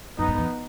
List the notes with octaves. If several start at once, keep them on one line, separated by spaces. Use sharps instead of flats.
F#2 B3 D#4
G#2
E2